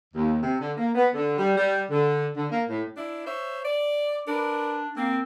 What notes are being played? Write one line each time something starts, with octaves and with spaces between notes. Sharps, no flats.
D#2
C3
D3
A#3
B3
D3
G3
G3
D3
D3
A#3
A2
D4 E4
C5 C#5 E5
D5
D4 A#4 B4 D5
A#3 C4